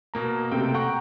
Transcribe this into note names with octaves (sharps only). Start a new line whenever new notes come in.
B2 A#3 A#5
C3 A3 G5
F#5 G5 A#5 C#6